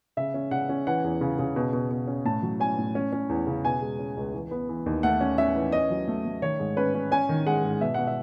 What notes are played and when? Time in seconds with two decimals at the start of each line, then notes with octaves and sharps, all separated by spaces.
0.17 C#3 E5
0.34 C#4
0.51 C#3 F#5
0.69 C#4
0.87 E3 F#5
1.04 E2
1.21 C#3
1.39 C#3
1.56 B2
1.73 B2
1.91 B2
2.07 C#4
2.25 A2 A5
2.42 F#3
2.60 C#4 G#5
2.78 A2
2.95 C#4
3.13 C#4
3.29 E2
3.47 C#3
3.65 B2 G#5
3.82 G#3
3.99 C#4
4.17 C#2
4.33 E3
4.51 B3
4.69 E3
4.86 D#2
5.03 A3 F#5
5.21 C#4
5.38 C#4 E5
5.55 E3
5.72 C#4 D#5
5.90 F#3
6.08 A3
6.25 A3
6.42 D#3 C#5
6.60 G#2
6.77 C#4 B4
6.94 C#4
7.11 C#4 G#5
7.29 D#3
7.46 G#3 F#5
7.64 G#2
7.81 B2 E5
7.94 B2 F#5
8.07 E5